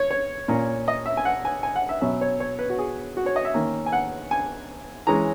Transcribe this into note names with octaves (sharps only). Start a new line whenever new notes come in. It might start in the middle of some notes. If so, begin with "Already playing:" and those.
Already playing: C#5
C#5
A#2 A#3 C#4
D#5
E5
G#5
F#5
G#5
G#5
F#5
E5
B2 F#3 C#4 E5
C#5
C#5
B4
F#4
G#4
F#4
C#5
D#5
E5
D#3 A#3 C#4
G#5
F#5
G#5
E3 G#3 C#4 A#5